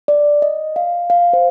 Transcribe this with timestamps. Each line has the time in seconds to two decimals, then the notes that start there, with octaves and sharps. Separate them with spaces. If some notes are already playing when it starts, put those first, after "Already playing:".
0.08 D5
0.42 D#5
0.76 F5
1.10 F5
1.33 C5